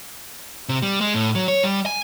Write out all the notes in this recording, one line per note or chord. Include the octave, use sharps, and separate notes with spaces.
C3
G3
G#3
A2
F#3
C#5
G3
G#5